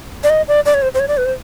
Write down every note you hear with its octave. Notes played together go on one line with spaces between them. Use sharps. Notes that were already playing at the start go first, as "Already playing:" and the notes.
D5
D#5
D5
D5
C#5
C5
C5
C#5
D5
B4
C5